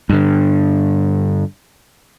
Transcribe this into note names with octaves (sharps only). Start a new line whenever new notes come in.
G2 D3